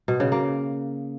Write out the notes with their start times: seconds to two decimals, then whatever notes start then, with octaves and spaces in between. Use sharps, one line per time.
0.08 B2
0.20 C#3
0.32 A#3